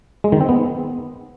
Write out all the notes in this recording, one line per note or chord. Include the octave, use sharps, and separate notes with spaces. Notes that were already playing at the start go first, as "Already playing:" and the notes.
G#3
D#3
C4
B3